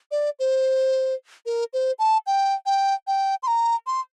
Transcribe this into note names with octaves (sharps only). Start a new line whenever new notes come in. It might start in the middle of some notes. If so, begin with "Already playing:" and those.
D5
C5
A#4
C5
A5
G5
G5
G5
C6
A#5
C6